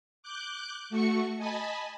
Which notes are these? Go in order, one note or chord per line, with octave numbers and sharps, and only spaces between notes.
D6 F#6 G6
A3 F#4 C#6 C#7
D#5 G#5 A5 B5